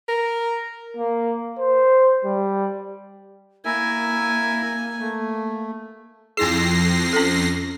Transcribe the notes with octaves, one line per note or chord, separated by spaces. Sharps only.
A#4
A#3
C5
G3
A#3 E4 A#4 E5 G#5
A3
F2 C4 E4 G#4 A#6 C7
C#4 A4